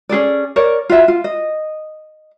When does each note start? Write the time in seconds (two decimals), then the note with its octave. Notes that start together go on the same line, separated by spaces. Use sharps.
0.09 C#4 G#4 A4 D5
0.56 A#4 C#5 D5
0.90 F4 F#4 E5
1.08 F4
1.24 D#5